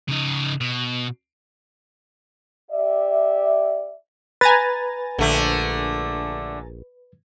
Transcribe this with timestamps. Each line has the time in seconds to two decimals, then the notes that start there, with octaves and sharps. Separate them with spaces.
0.08 C#3 D#4
0.61 B2
2.71 G4 D5 E5
4.41 B4 G#5 A#5 A6
5.19 A#1 D3 A3